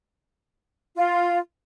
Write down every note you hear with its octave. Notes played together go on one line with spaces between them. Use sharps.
F4